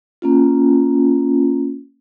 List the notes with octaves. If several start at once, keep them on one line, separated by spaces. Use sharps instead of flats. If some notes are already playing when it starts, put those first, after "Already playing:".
A#3 C#4 F4